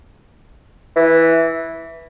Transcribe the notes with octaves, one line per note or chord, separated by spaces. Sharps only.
E3